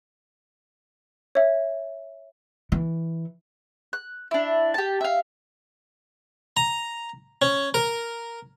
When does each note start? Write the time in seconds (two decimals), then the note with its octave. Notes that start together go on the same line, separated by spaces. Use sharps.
1.35 C#5 E5
2.72 E3
3.93 F#6
4.31 D4 E4
4.74 G4 A5
5.01 E5 F5
6.57 A#5
7.42 C#4
7.74 A#4